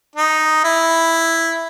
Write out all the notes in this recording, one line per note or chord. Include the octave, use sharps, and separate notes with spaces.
D#4
E4